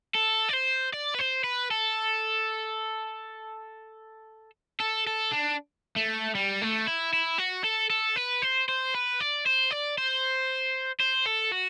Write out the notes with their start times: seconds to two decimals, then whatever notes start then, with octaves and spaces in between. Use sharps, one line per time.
0.15 A4
0.49 D5
0.54 C5
0.93 D5
1.14 B4
1.19 C5
1.44 B4
1.71 A4
4.80 A4
5.07 A4
5.32 D4
5.96 A3
6.35 G3
6.62 A3
6.87 E4
7.13 E4
7.38 F#4
7.64 A4
7.90 A4
8.16 B4
8.42 C5
8.68 C5
8.94 B4
9.20 D5
9.46 C5
9.71 D5
9.98 C5
11.00 C5
11.26 A4
11.52 F#4